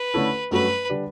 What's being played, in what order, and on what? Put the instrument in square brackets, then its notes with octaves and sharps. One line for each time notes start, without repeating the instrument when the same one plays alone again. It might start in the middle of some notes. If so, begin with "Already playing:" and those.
Already playing: [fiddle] B4
[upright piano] D3 A3 C#4 E4 A4
[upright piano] G2 F#3 A3 C#4 F#4 [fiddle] B4
[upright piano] D3 G3 D4